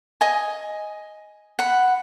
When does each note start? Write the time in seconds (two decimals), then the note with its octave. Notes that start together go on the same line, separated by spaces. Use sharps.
0.21 D#5 G#5
1.59 F#5 B5